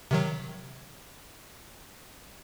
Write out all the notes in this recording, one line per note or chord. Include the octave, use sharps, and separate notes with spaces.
C3 D#3 F#3